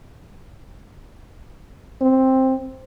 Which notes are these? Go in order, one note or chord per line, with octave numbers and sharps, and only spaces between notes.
C4